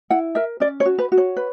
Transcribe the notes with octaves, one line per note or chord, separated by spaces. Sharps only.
E4 F#5
A#4 E5
C#4 D5
C#5
F#4
B4
F#4
C#5
B4